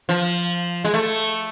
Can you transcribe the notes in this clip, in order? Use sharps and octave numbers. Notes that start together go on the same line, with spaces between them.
F3
G#3
A3